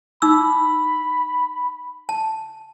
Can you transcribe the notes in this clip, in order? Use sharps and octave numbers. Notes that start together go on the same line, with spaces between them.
D#4 B5 D6 E6
A5